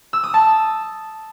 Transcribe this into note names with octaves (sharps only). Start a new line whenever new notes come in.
E6
D#6
A5